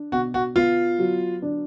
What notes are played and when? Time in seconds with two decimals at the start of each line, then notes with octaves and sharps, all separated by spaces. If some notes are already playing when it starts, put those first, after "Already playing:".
Already playing: D4
0.12 B2 F#4
0.34 F#4
0.56 B3 F4
0.99 F#3
1.42 D4